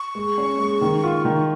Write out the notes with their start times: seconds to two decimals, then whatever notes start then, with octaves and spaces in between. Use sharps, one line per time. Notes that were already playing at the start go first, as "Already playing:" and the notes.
Already playing: C#6
0.15 G#3
0.38 C#4
0.59 G#3
0.81 D#3
1.04 F4
1.25 D#3